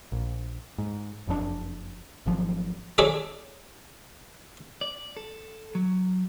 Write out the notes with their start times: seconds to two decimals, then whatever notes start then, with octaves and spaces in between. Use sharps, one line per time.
0.12 A#1
0.78 G#2
1.27 F#1 F2 C3 D4
2.26 G#1 F3 F#3
2.98 G#4 A4 C#5 D5 E5
4.81 D5
5.17 A4
5.75 F#3